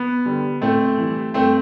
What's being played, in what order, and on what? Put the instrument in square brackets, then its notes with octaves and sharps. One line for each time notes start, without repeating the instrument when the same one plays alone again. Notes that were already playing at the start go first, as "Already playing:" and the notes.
Already playing: [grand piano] B3
D3 G3
A2 A3 C4
E3 G3
G2 A3 C4